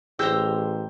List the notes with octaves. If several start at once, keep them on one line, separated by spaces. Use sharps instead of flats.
A1 G4 G#4 C5 A#5 E6 G6